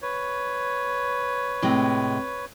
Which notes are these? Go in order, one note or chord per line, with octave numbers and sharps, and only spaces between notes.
B4 C#5
A2 C3 G#3